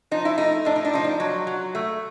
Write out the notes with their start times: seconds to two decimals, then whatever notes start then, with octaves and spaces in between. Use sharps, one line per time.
0.11 F3 D#4
0.25 E4
0.38 A3 D#4
0.65 A2 D4
0.76 D#4
0.85 D4
0.94 F3 D#4
1.04 D4
1.20 F#3
1.47 F#3
1.75 A3